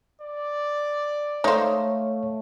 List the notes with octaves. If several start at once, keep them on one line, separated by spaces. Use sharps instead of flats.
D5
A3 D#4 C5 C#5 F5